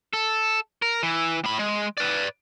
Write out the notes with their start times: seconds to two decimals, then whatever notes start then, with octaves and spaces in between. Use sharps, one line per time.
0.13 A4
0.82 A#4
1.03 E3
1.44 A2 B5
1.59 G#3
1.97 B4 D5